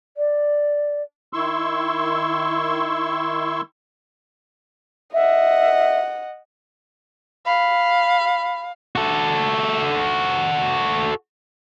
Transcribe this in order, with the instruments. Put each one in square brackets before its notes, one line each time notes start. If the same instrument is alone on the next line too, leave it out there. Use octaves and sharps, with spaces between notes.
[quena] D5
[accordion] D#3 E4 C6 C#6 E6
[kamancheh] D#5 F#5 [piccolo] E5
[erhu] F5 [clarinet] B5
[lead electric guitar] F#4 A4